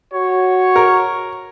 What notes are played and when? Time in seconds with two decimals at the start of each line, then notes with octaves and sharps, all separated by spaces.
0.13 F#4 C#5
0.76 A#4